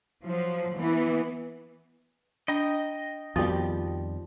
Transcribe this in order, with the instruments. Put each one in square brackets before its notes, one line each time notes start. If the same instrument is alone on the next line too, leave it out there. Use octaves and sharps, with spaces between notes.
[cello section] F3 F#3
E3 B3
[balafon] D4 [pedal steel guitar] D#5 G5 A#5
[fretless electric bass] F2 D#3 G3 [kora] F3 G4 [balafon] B3 F#4